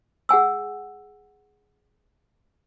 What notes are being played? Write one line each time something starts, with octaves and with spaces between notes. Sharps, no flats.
G#4 F#5 G#5 E6